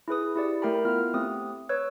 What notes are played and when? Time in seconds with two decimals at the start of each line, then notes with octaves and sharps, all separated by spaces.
0.08 E4 G#4 B4 D#6
0.36 E4 G4 D5
0.62 A3 A#4 G5 A#5 B5
0.85 B3 E4 F4 F6
1.14 A3 C4 G4 D#6
1.69 B4 C#5 E6